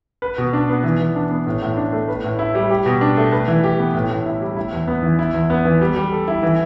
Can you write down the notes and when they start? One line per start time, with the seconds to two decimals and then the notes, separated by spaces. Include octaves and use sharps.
0.22 B4
0.38 B2
0.53 D4
0.69 B3
0.84 E3
1.00 E3
1.15 D4
1.31 B3
1.46 A2
1.62 A2
1.77 D4
1.93 A3
2.08 B4
2.24 A2
2.39 E4
2.55 G3
2.70 G4
2.86 B2
3.01 D4
3.17 A3
3.32 B4
3.48 E3
3.64 G4
3.79 B3
3.95 A2
4.11 A2
4.26 E4
4.41 G3
4.56 E4
4.72 E2
4.87 B3
5.03 E3
5.19 E4
5.34 E2
5.50 B3
5.65 E3
5.81 G3
5.96 G3
6.12 A4
6.28 E4
6.43 E3